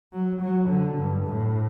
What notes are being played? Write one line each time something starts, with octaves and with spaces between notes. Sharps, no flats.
F#3
F#3
D3
G2
A2